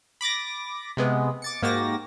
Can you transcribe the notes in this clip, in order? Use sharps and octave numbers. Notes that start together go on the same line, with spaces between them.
B5 D6 A6 A#6
C3 G#3 B3
D6 A6 C#7
G#2 A#3 F#4 G4 A6 A#6